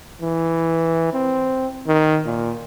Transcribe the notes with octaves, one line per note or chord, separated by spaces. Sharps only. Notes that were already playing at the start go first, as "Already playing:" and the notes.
E3
C4
D#3
A#2